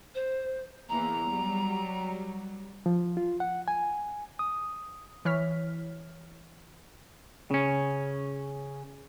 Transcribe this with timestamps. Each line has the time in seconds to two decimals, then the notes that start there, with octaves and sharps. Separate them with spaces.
0.15 C5
0.89 E2 E3 A#3 A#5
1.26 F#3 G3
2.86 F3
3.17 F4
3.40 F#5
3.68 G#5
4.39 D#6
5.25 E3 C#5 F6 B6
7.51 C#3 C#4